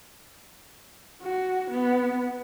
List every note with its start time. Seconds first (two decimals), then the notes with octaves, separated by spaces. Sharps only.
1.22 F#4
1.70 B3